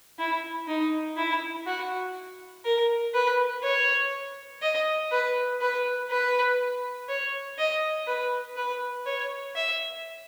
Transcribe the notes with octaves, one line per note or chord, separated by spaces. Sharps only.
E4
D#4
E4
F#4
A#4
B4
C#5
D#5
B4
B4
B4
C#5
D#5
B4
B4
C#5
E5